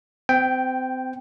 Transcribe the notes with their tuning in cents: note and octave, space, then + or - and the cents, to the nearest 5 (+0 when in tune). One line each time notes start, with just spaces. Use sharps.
C4 -30 G5 +0